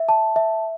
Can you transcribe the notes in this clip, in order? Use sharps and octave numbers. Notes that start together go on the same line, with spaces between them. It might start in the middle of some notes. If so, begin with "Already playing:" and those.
Already playing: E5
A5
E5